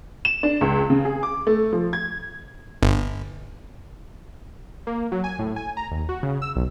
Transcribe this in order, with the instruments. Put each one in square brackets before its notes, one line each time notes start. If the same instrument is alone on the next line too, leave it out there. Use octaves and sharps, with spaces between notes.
[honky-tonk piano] E7
D4
C#2
C#3
G#4
D6
A3
F3
G#6
[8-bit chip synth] G1
[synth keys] A#3
F#3
G#5
A2
G#5
A#5
D#2
F#4
C#3
E6
B1